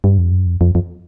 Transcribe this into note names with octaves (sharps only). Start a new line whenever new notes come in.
G2
F2
F#2
F2
F2
F2